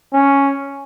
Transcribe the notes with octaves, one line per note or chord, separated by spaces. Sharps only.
C#4